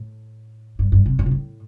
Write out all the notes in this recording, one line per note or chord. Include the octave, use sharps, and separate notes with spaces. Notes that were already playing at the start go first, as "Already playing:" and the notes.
Already playing: A2
G2
G2
C3
A2
C3
A2